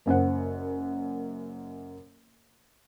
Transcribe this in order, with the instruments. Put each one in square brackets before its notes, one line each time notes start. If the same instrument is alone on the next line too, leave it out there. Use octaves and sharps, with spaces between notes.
[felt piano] F#1 F#2 C5 F#5